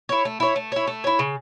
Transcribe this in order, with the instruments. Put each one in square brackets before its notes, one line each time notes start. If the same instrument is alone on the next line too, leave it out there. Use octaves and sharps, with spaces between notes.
[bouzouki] E4 C#5
A3
E4 C#5
A3
E4 C#5
A3
E4 C#5
C#3